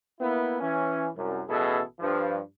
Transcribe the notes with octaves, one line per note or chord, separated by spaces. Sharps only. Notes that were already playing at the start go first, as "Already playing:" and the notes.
A#3 B3 E4
E3 C#4
C2 F#2
A1 B2 E4 G#4 A4
G2 F3